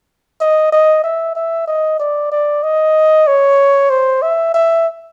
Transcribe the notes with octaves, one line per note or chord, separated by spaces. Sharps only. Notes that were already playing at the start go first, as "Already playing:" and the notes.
D#5
D#5
E5
E5
D#5
D5
D5
D#5
C#5
C5
E5
E5